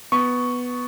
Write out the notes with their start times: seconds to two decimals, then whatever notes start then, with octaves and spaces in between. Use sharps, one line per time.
0.12 B3 C#6